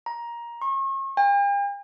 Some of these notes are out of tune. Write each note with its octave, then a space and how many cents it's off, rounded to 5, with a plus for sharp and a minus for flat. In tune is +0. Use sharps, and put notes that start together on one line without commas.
A#5 +15
C#6 -40
G5 +45